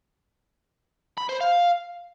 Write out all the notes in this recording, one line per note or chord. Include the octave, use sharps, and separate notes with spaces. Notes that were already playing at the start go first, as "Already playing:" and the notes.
B5
C5
F5